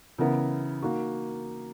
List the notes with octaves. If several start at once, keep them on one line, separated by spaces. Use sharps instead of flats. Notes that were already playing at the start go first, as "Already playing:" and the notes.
C#3 E3 B3 E4 A#4
A#3 D#4 F#4